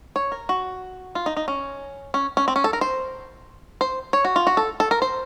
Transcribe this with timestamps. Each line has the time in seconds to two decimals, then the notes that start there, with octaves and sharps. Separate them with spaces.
0.16 C#5
0.32 A#4
0.49 F#4
1.15 F4
1.26 D#4
1.37 D#4
1.48 C#4
2.14 C#4
2.37 C#4
2.48 C4
2.56 C#4
2.64 A4
2.73 A#4
2.81 C5
3.81 C5
4.13 C#5
4.25 F#4
4.36 F4
4.47 F#4
4.57 A4
4.80 A4
4.91 A#4
5.02 C5